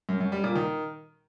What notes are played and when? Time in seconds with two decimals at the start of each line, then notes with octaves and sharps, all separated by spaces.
0.09 F#2
0.20 F#2
0.32 G3
0.44 A#2
0.55 D#3